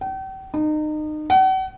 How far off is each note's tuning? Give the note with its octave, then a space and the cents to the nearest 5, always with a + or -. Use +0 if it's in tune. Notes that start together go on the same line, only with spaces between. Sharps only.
G5 -40
D#4 -30
F#5 +40